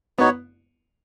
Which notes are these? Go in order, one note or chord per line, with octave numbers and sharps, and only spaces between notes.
B3 D#4 F#4 C#5